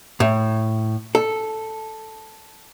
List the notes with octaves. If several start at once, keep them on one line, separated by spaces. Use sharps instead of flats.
A2
A4